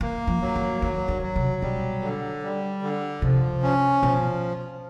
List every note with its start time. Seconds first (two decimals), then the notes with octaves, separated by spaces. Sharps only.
0.01 E3 A#3
0.27 F3
0.42 F#3
0.55 E3
0.81 D#3 F#3
1.08 D3
1.22 F#3
1.36 C3
1.62 B2 G3
2.02 D3
2.43 G3
2.82 D3
3.22 C3 F3
3.62 C#4
4.02 B2 F3